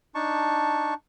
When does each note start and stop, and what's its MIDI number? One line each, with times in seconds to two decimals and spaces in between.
0.15 0.94 62
0.15 0.94 63
0.15 0.94 81
0.15 0.94 85